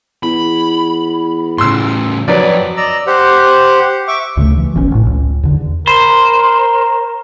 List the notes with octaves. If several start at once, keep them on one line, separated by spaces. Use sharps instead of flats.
E2 B5
A2 C#3 C6 E6
F2 F#3 B4 D5
D5 D#5 A#5 E6
G4 C5 F#5
E5 C#6 D6
D2 C#3 E3 A3
E3
F1 B1 B2 C#4
A1 A2
C#2
E2 D3
A#4 C5 B5